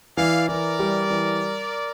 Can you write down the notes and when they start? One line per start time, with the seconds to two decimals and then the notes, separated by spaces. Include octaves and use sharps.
0.17 E3 D5 F5
0.48 E3 A#4 D5
0.79 G3
1.10 E3